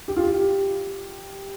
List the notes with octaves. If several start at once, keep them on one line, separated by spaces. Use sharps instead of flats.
G4
F4
G4